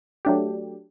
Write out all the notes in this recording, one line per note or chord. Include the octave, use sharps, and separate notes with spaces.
F#3 A3 D4 G4